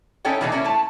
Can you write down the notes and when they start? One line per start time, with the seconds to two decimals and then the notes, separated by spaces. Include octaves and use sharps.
0.25 C#4 D#4 E4 A4 C#5 G5
0.41 B2 E3 A#3 D4 D#4 G#4
0.52 A#3 C#4 E4
0.64 A3 A5